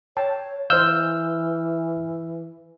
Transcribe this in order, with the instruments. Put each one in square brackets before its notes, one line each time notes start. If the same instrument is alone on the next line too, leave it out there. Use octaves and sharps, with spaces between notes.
[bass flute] C#5 [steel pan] G5 A5
[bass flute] E3 [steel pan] C5 D#5 F5 [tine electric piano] E6 F6 G6